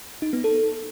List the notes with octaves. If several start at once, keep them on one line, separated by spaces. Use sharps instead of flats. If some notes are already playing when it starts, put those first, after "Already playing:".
D#4
B3
A4